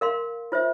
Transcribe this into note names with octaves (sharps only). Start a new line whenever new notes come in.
A#4 F5 C6
F4 C5 E5